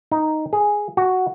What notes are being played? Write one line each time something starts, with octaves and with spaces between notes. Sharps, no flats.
D#4
G#4
F#4